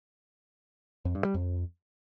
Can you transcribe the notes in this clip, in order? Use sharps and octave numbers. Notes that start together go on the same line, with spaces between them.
F2
G2
G3
F2